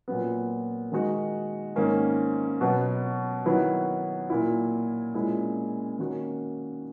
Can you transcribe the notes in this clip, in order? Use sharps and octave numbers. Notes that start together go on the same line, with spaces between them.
A#2 F#3 B3
D#3 G#3 D#4 F#4
G#2 D#3 A#3 C#4
B2 F#3 B3
D#3 F#3 B3 E4
A#2 F#3 A#3 E4
A#2 G#3 C#4 E4
D#3 A#3 C#4 F#4